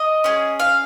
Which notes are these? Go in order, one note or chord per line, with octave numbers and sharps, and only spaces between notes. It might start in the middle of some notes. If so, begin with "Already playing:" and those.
Already playing: D#5
C#4 G#4
F5